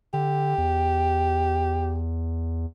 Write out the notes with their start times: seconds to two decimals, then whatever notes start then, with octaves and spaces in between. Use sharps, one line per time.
0.13 D3 G4
0.58 E2